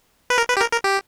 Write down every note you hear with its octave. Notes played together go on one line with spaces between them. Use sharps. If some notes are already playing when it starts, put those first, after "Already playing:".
B4
A#4
B4
G4
A#4
A#4
G4